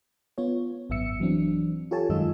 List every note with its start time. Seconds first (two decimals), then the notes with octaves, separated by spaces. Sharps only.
0.38 B3 F4 C#5
0.90 G#1 F#2 B3 E5 E6 C#7
1.20 E3 F#3 C4 D4
1.91 F4 G4 A4 C#5 G#5 A5
2.09 F#2 D#3 G#3 F4 D#5 E6